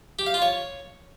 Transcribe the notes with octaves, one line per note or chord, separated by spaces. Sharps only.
G4
F5
F4
C#5